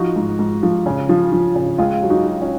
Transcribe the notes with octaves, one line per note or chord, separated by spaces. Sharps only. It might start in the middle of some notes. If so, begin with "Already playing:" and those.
Already playing: F3 D#4 F#4
G#2
G#2
F3
C#3
F3
F3
C#3
C#2 F4 G#4
F#3
D#4 F#4
F#3
C#4 F4